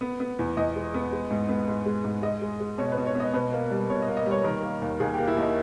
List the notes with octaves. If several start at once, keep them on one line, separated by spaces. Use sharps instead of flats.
B3
B3
E2
E2 D#5
G#3
B3
G#3
G#2
B3
G#2
G#3
G#2
G#3 D#5
G#3
G#3
B2 C#5
B4
B2
C#5
B3 D#5
B2 B4
A#3
G3
B2 C#5
D#5
A#3
D#5
G3
C#5
D#3 A#4
A#3
D#2
D#2 G#4
A#3 G4
E4
D#2 D#4